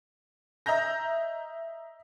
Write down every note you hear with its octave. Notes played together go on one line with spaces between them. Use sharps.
D#5 E5 A#5 G6 A#6